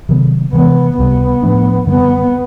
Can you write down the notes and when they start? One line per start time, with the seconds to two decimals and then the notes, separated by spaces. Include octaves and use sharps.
0.09 C3 D#3 F#3 B3
0.53 C3 E3 G#3 B3
0.97 C#2 C3 E3 G3 B3
1.42 A2 F3 A3 D4
1.87 F#2 D3 G3 B3 C4